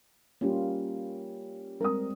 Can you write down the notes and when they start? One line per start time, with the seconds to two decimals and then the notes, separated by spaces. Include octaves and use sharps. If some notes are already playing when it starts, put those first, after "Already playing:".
0.41 G3 A#3 C#4 F4
1.81 G3 G#3 C4 A#4 D#6